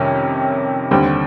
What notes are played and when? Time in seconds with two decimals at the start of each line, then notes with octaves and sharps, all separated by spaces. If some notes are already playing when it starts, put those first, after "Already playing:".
Already playing: F2 C3 D#3 G3 C#4
0.91 D#2 D3 G3 C4